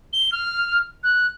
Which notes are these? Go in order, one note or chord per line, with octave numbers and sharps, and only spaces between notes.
G7
F6
F#6